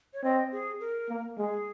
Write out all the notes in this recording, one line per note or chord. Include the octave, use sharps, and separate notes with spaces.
C#5
C4 D#5
G#4
A#4
A#3
G#3 G#4